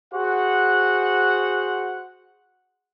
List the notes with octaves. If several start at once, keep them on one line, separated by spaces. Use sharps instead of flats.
F#4 G#4 C5 F#5